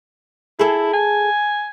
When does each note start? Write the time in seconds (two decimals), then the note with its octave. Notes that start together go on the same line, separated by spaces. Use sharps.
0.59 E4 G#4 A4
0.93 G#5